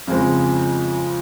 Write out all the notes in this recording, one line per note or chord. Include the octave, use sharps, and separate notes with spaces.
F2 C#3 F3 G#3 C4